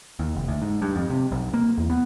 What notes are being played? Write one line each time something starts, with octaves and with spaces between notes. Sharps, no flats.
D#2
F1
D2
G#2
G2
F2
C3
B1
A#3
E2
B3